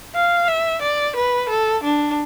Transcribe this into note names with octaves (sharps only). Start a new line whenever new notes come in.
F5
E5
D5
B4
A4
D4